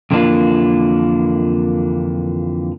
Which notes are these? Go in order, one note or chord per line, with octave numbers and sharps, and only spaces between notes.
F2 D3 E3 A#3 D4 F4